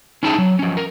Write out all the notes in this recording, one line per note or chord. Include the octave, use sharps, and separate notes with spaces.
C#4 D#4 E4 G#4 A5
F#3
F3 C#4
A#4